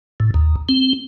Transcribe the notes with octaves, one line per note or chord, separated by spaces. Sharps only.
A2
D#2
C4